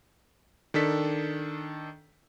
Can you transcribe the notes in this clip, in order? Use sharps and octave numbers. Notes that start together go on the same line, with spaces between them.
D#3 D4 A4 B6